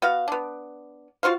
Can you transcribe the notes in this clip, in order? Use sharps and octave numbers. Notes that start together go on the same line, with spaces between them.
B3 F#4 F5
B3 D4
F4 F#4 C5 F5